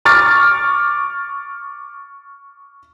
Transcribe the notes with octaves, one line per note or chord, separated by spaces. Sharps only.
C#6 D6 F6 A6